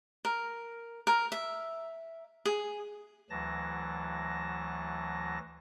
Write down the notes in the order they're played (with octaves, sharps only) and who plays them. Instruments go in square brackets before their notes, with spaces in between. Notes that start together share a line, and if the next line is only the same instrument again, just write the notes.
[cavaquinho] A#4
A#4
E5
G#4
[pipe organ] D2 E3 F#3 A5 A#6